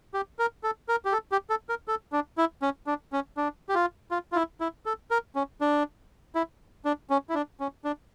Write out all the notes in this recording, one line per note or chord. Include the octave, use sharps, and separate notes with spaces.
G4
A#4
A4
A#4
G4
A4
G4
A4
A#4
A4
D4
E4
C#4
D4
C#4
D4
G4
F4
F4
F4
E4
E4
A4
A#4
C#4
D4
E4
D4
C#4
E4
D4
C#4
D4